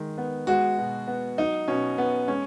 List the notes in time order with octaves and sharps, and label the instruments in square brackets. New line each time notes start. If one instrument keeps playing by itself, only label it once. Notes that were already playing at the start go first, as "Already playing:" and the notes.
Already playing: [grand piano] D#3 G#3
B3
G#3 F#4
B2
B3
F#3 D#4
B2 C#4
B3
G#3 C#4